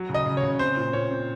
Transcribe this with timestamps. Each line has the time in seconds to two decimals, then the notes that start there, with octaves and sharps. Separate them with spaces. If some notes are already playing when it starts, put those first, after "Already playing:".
Already playing: F#3
0.09 C#3
0.15 D#5
0.26 C#3
0.37 C#5
0.43 C#3
0.59 C4 C5
0.77 A#2
0.93 A#2 C#5
1.11 C4